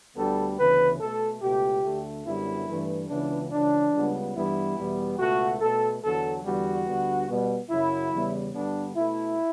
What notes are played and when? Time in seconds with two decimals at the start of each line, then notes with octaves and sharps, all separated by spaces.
0.16 D2 D3 G3 B3 A4
0.58 D2 C#3 E3 B3 B4
1.00 B2 A3 A4
1.42 C#2 B2 A3 G4
1.84 D2 D3 A3
2.25 F#2 D3 G3 B3 E4
2.68 G2 E3 A3
3.09 C#2 C#3 E3 B3 D4
3.51 C#2 C#3 E3 D4
3.93 C#2 C#3 G3 B3
4.35 G2 E3 G3 B3 E4
4.77 E2 B2 G3 B3
5.18 C#2 B2 A3 F#4
5.60 B2 A3 A4
6.02 E2 D3 F#3 B3 A4
6.44 E2 D3 G3 B3 F#4
6.87 D2 D3 G3 B3
7.28 B2 G3 B3
7.70 F#2 C#3 F#3 E4
8.12 E2 C#3 G3 B3
8.54 G2 D3 G3 B3 D4
8.96 B2 A3 E4